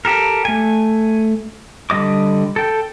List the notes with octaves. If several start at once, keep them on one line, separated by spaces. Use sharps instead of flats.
G4 A4 A#4
A3 G#5
D3 G3 D#5 D6
A4 G5